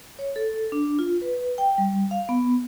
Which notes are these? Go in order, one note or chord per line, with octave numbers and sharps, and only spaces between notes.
C#5
A4
D4
F4
B4
G5
G3
F5
B3